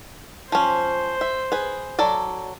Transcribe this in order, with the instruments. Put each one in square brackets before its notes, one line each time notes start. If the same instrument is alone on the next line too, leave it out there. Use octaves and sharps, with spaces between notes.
[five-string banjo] F3 C#4 [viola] C5
[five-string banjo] E5
G#4 B4
F#3 A4 D5